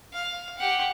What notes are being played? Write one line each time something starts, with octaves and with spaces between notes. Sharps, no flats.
F5
G4 F#5